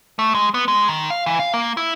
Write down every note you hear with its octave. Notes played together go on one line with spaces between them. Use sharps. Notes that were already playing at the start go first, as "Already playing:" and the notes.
A3
G#3
B3
G#3
D#3
F5
E3
F5
A#3
E4